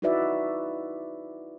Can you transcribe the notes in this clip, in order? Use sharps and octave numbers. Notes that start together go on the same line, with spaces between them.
D#4 E4 F#4 B4 D5 E5